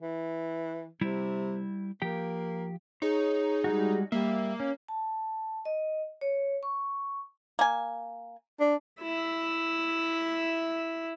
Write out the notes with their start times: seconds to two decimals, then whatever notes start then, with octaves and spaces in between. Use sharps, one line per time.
0.02 E3
1.01 C3 G3 E4
2.02 F3 A#3 G4 G5
3.02 D#4 G#4 C#5
3.64 G3 G#3 F#4
4.12 G3 A#3 E5
4.60 C#4
4.88 A5
5.65 D#5
6.21 C#5
6.63 C#6
7.59 A#3 G#5
8.60 D4
9.01 E4 E5